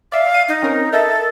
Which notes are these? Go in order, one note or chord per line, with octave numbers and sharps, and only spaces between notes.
D5 E5 F5
D#7
D#4
C4 C#4 A#4
A4 A#4 D#5 E5